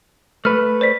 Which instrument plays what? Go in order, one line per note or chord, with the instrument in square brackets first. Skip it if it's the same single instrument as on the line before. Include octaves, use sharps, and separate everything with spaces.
[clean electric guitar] A3 B4 [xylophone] F6
[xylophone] C5 D5 B6